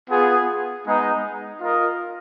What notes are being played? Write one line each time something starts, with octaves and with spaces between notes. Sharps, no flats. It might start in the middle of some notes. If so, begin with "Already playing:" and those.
B3 F4 G#4
G#3 B3 D#4
F4 A#4 D#5